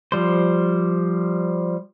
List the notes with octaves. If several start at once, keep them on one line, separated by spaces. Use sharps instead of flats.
F3 G3 C5